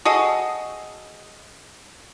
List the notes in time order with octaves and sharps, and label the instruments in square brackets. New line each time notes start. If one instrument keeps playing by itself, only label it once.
[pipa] F#4 G#4 A4 D#5